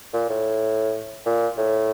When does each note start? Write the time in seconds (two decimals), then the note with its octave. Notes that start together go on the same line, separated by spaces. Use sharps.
0.13 A#2
0.29 A2
1.26 A#2
1.58 A2